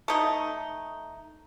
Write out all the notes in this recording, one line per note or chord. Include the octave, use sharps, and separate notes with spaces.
A3 D#4